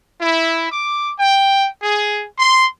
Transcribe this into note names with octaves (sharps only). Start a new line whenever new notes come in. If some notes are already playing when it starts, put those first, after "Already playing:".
E4
D6
G5
G#4
C6